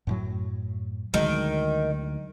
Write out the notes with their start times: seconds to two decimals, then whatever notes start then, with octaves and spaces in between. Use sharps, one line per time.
0.07 F#2 A2 F#3
1.14 D2 D#3 F#3 G#3